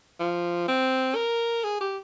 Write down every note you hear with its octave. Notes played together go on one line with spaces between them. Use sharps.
F3
C4
A#4
G#4
G4